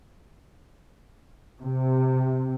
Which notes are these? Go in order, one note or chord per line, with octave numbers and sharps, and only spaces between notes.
C3